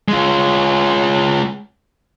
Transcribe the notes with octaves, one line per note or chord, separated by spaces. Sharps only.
G#3 F4